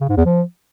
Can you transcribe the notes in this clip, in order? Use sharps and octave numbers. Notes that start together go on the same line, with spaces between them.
C#3
G#2
E2
F3